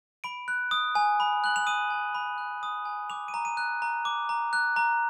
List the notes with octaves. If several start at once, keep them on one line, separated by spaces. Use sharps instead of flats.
B5 D7
F#6
D#6
G#5
B5
F#6 F#7
F7
D#6 D#7
G#5
B5
F#6
D#6
G#5
D6 F7
D#7
A#5
D#7
F#6
A#5
D6
A#5
F#6
A#5